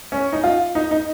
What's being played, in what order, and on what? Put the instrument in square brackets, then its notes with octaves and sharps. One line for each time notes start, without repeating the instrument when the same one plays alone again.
[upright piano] C#4
D#4
F4
D#4
D#4